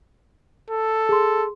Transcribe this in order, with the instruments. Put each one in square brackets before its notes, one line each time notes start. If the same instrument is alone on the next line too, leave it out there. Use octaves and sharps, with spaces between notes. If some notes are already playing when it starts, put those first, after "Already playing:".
[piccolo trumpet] A4
[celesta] G#4 C6